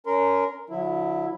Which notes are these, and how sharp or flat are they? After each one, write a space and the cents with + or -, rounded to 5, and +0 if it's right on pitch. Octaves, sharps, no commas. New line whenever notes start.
C#4 +20 A#4 +0 C6 -30
D3 +0 F#3 -35 E4 -5